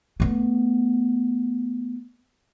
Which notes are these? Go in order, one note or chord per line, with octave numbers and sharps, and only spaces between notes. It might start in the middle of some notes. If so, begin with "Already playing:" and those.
A3 B3